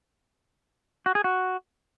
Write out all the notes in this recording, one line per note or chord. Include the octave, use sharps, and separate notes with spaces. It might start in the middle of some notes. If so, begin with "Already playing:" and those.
F#4
G#4
F#4